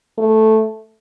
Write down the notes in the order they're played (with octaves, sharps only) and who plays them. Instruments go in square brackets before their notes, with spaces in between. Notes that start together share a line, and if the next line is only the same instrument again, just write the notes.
[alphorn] A3